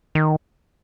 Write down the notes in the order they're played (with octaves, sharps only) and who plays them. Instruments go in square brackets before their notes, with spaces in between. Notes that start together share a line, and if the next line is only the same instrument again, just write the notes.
[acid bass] D#3